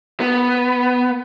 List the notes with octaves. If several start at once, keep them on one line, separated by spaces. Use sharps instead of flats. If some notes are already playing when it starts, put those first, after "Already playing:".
B3